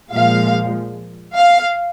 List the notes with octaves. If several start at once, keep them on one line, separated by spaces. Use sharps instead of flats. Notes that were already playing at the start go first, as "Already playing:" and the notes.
A#2 F3 G#3 F5
F5